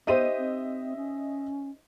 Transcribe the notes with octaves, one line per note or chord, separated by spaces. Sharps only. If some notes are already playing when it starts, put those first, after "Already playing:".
B3 D#4 G4 C5 D#5 E5 D#7
C4
C#4